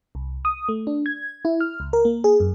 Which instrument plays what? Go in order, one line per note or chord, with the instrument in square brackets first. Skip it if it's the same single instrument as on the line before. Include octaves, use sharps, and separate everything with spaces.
[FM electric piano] C2
D#6
A3
D4
G#6
E4
F6
C#2
A#4
A#3
G#4
F#2